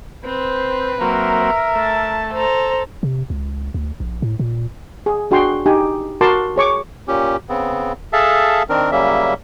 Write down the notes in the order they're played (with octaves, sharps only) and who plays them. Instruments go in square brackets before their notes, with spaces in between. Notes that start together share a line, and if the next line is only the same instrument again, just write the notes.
[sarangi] C4 [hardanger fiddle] B4 [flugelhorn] C5
[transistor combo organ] F#3 A#3 C4 [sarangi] A#4 [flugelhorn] E5
[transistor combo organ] A3 [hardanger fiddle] A5
[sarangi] A4 [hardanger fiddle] C5 A#5
[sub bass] C3
C#2
D2
A#1
A2
A#2
[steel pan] G#4
D4 F#4 G#4 G5 C6
D#4 G4 G#5
F#4 A#4 A5 C6 D6
G#4 C#5 C#6 D6
[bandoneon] A#2 C#4 G4
C#3 B3 C4
G#4 A4 E5 F5 A5
D#3 C4 D4 A#4
C#3 F#3 G3 A#3 C#4 E5